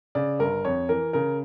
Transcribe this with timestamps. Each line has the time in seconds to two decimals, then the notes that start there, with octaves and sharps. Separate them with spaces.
0.15 C#3 D5
0.39 G1 A#4
0.65 F2 C#5
0.89 E3 A#4
1.13 C#3 A#4